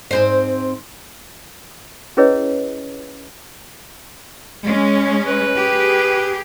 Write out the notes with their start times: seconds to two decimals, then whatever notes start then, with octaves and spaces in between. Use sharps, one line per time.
0.11 G#2 C4 C5
2.17 C#4 E4 G#4 B4 C#5 D#5
4.63 G#3 C#4
5.25 B4
5.56 G4 G#4